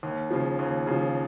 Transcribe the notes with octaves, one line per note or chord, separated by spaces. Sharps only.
D#2
C#3 F3
D#2
C#3 F3